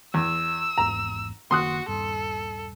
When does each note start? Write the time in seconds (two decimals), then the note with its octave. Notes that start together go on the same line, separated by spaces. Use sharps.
0.14 E2 E6
0.78 G#1 E2 G#2 A#5
1.51 F#1 D#3 A#3 F#4 C6 D#6 F#6
1.88 D#1 G2 A4